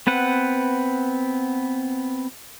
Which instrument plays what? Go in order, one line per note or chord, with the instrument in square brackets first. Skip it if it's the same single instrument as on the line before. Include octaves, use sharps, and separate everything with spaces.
[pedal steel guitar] B3 C4 B4 F#5